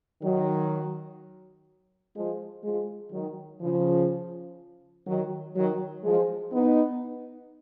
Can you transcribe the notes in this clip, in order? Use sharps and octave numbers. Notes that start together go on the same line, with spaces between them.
D#3 F#3
F3 G#3
F3 G#3
D#3 F#3
C#3 F3
D#3 F#3
D#3 F#3
F3 G#3
B3 D#4